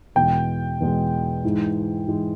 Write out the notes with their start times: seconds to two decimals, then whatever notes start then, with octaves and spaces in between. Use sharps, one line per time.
0.15 E2 B2 G#3 G5
0.80 E2 B2 G#3
1.44 G#2 E3 G#3
2.08 G#2 E3 G#3